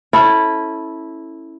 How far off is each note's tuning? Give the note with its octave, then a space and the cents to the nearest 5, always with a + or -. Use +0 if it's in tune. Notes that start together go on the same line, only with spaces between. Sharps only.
C#4 -15 E4 -10 A4 +0